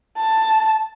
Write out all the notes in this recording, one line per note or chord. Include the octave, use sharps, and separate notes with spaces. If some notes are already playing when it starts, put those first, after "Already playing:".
A5